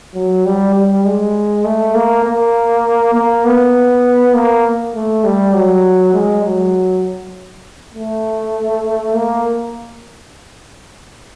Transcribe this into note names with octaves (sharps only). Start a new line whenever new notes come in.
F#3
G3
G3
G#3
A3
A#3
A#3
A#3
B3
A#3
A3
G3
F#3
G#3
F#3
A3
A#3